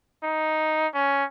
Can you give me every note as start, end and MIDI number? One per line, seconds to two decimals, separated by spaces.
0.23 0.88 63
0.94 1.24 61